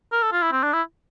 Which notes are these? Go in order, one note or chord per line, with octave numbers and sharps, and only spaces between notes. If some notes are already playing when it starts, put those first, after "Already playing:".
A#4
A4
F4
E4
C4
D4
E4